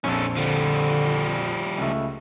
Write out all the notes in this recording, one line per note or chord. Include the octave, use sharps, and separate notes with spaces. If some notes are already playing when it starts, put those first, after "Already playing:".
A#1 F2 C#4 A4
D3 F3 G3
C#2 A3